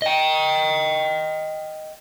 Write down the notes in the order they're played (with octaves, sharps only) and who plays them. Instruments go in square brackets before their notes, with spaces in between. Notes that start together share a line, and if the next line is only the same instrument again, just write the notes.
[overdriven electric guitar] D#5 G5